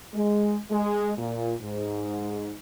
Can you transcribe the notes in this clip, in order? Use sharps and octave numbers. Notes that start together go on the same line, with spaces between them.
G#3
G#3
A#2
G#2